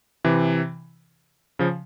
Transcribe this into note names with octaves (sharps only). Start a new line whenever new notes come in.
C3 E3
C#3 F3